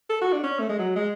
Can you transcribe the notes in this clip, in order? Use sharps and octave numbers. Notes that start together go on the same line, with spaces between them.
A4
F#4
D4
C#4
A3
G#3
F#3
G#3